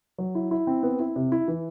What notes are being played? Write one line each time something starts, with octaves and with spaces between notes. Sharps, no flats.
F#3
E4
E4
C4
B3
E4
C3
E4
E3